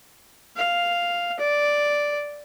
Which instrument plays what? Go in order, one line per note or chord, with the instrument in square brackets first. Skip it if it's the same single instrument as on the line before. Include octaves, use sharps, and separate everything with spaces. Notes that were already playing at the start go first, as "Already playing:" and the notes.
[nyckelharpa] F5
D5